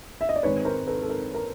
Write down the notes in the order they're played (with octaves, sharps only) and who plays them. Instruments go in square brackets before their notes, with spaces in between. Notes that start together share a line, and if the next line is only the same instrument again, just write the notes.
[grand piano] E5
D#5
D5
G#2 D#3 G#3 C4 D#4 B4 C#5
A#4 C5
A4 B4
A4
A#4
A#4